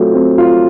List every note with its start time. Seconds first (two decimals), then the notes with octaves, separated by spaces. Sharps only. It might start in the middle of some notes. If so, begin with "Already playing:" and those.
Already playing: F#3 A3 C4 F4
0.13 C4
0.38 F4